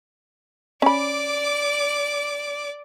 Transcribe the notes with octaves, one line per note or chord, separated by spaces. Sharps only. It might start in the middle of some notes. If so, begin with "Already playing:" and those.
C#4 D5 B5 D6